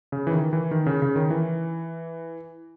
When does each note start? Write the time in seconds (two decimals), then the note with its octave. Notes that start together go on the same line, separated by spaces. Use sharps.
0.12 C#3
0.27 E3
0.32 D#3
0.53 E3
0.71 D#3
0.86 C#3
1.02 C#3
1.16 D#3
1.30 E3